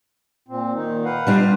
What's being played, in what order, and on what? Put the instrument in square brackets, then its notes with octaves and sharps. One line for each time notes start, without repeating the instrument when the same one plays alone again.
[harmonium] A#2 C4
A#2 D#3 D#4
B4 F5 F#5
[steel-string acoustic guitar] G3 D4 F4